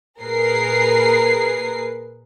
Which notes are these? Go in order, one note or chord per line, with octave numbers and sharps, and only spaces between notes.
A#2 G#4 A#4 B4 C7